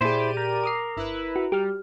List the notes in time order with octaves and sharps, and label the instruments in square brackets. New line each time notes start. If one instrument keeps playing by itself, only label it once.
[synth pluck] A#2 G#4 [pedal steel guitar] E4 C5 [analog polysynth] G4 D5 D#7
[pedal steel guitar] A#4
[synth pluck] D6 D#6 C7
[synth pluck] G1 [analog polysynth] E4 B4
[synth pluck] F#4
[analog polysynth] G3 [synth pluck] G4 F6